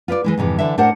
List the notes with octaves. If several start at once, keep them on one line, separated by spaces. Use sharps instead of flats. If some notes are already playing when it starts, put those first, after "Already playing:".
F4 B4 C#5 D5
E3 G#3 E4
F2 G#2 C3 E3
D3 E3 D4 E5
A2 D4 A#4 C5 F#5